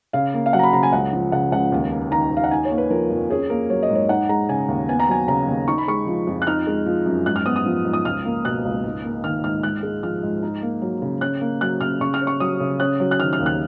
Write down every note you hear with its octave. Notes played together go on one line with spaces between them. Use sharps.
C#3 F5
A#3
F5
F#3 F#5
A#5
B5
C#3 A#5
G#5
C#2 F#5
F3
C#3 F#5
C#2 F#5
D#2
A#3
D#3 A#5
D#2
F5
F#5
D#4 G#5
C#5
A#3
B4
F3 A#4
F2
C#4 G#4
A#3 A#4
F#3 C#5
D#5
G#2
C#5
D#4 F#5
G#3 A#5
C#3 G#5
D#2
B3 G#5
A#5
F#3 G#5
C#3 A#5
D#2
D#4 C#6
B5
G#3 C#6
F3
F2
F#6
D#4 F6
G#3
F3
F#2
G#2 F#6
F6
B3 D#6
D#6
F3
G#2
D#6
C#2 F6
A#3
B2 F#6
C#2
G#2
A#3
D#3 F6
G#2 F6
G#2 F#6
G#3
F3 F6
G#2
D#4
A#3
F#3
C#3
C#4 F#6
A#3
F#3 F#6
C#3 F6
C#3 C#6
F6
C#4
C#6
F#3 D#6
C#3
C#4 F#6
F#3
F#6
D#3 F6
F6
D#2
F#6